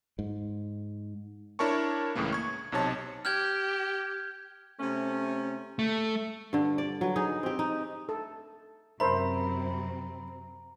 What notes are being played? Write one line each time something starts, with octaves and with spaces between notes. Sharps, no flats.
G#2
D4 E4 A#4 C#5 A5 C#6
C#2 A2 C#3 E3 A#3
C#6 G#6
B1 C3 D#4 C#5 A5
G4 F6 G6 G#6
C3 A3 C#4
A3
G2 D3
D5
F#3 B4
D#4 G#4
C4 G4
D#4
A4
F#2 C3 C4 A#4 C5 E5 A#5 B5